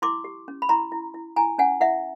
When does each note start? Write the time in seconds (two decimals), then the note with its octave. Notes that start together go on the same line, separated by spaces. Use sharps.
0.02 E4 C6 D6
0.24 G4
0.48 C#4
0.62 B5
0.69 E4 A#5 C6
0.92 E4
1.14 E4
1.36 E4 G#5 A#5
1.58 C#4 F#5 G#5
1.80 E4 E5 F#5